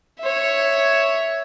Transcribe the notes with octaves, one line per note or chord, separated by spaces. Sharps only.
C#5 E5